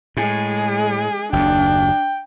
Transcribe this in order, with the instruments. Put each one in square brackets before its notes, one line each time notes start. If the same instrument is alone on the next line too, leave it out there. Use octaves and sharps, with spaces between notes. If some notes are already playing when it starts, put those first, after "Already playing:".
[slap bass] A2 [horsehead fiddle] G#3 G#4
[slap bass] F#1 D#2 [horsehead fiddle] D4 [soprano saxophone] G5